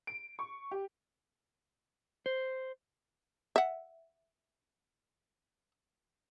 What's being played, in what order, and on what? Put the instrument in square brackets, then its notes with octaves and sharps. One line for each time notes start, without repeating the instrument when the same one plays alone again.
[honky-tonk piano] D7
C#6
G4
[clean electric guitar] C5
[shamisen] E5 F#5